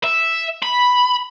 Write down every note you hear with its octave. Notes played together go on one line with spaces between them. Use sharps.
E5
B5